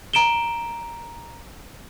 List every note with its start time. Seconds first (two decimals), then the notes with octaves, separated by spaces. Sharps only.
0.13 A#5 D7 E7 G7